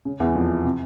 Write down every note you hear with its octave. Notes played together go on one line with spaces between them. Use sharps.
C#3
E2 E3
F2 F3
C3